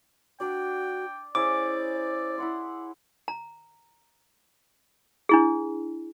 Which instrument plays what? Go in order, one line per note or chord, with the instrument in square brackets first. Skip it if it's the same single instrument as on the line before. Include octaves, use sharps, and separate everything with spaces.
[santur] D4 D5 [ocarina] F#4 [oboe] G5
[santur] C#4 E4 G#4 [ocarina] C5 [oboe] D5 [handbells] D6
[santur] E4 F#5 C6
[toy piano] A#5
D4 E4 G#4